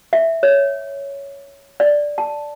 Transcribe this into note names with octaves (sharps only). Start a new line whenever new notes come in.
E5
C#5
D5
A5